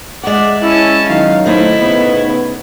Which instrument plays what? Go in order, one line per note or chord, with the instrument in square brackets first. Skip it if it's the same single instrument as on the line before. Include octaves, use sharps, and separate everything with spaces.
[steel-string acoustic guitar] G#3 F#5 [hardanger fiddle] D5 E5
[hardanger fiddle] C#4 A5 [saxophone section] E4
[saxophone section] D#3 F#3 [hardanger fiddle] F5
[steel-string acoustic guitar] A3 D#4 C5 [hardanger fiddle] E4
[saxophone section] A2 C#3 B3